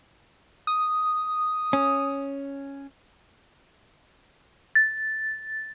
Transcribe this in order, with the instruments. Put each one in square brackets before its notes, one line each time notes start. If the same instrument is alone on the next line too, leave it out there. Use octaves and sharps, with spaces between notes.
[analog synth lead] D#6
[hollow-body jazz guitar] C#4
[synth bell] A6